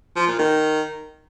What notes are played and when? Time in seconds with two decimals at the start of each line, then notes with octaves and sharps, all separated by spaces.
0.16 F3
0.27 A#2
0.39 D#3